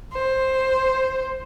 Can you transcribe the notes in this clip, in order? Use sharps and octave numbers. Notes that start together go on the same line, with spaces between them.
C5